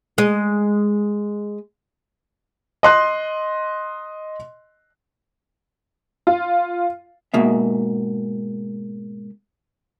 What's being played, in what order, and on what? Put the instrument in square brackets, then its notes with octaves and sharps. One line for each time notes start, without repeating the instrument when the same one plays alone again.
[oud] G#3 D#5
[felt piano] D#5 C6 F#6
[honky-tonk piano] F4
[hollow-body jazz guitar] G#2 B2 A#3 E5